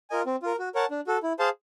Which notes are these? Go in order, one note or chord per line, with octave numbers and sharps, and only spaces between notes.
F4 A#4 D#5 G#5
C4
F4 A#4
F#4
A#4 C#5 F#5 A5
D4
F#4 A4
E4
G#4 C5 F5 A5